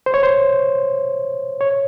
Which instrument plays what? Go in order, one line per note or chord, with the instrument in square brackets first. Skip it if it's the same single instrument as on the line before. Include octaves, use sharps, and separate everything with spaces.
[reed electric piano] C5
C#5
C5
C#5